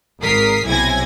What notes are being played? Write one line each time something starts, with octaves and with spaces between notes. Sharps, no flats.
G#1 A#4 D#6 B6 C7
B1 C3 E4 G#5 G#6 A#6